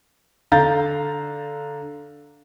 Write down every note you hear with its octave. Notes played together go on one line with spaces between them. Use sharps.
D3 F5 A#5 G6 A6